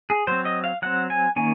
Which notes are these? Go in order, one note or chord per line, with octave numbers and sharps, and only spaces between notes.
G#4
F#3 C4 C5
D#5
F5
F#3 C4 F#5
G#5
D#3 A#3 C#4 G#5